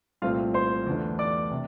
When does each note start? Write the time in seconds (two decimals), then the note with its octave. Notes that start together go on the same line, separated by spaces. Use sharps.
0.22 C2 A#2 A3 C4 F4 F5
0.54 C5 C6
0.87 E2 D3 A3 D4
1.19 D5 D6
1.51 C3